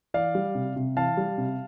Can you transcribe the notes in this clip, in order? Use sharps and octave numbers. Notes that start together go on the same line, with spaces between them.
E3 D5 F5
G3
C3
C3
E3 F5 A5
G3
C3